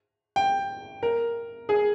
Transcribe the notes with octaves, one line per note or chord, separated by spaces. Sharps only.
G5
A#4
G#4